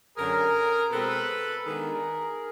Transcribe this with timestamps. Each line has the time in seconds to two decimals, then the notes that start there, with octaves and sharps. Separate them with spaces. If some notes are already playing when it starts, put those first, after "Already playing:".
0.17 F#2 D3 F#3 G#4 A#4
0.91 B2 G#3 C4 A4 B4
1.65 D#3 G#3 B3 D4 G#4 A#4